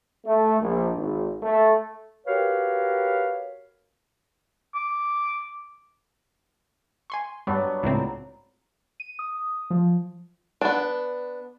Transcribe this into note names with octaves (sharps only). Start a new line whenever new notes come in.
A3
A#1
G#1
A3
F#4 G4 A#4 B4 C#5 F5
D6
G#5 C6 C#6
G2 F#3 G3 B3 D4
C#2 A2 C4 A#5
D#7
D#6
F3
B3 D4